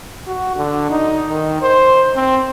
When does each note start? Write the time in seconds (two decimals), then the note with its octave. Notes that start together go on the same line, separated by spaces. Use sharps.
0.27 F#4
0.56 D3
0.90 D#4
1.30 D#3
1.62 C5
2.15 C4